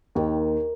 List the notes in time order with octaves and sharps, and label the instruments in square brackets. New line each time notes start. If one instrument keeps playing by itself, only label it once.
[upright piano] D#2 [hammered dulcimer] D#3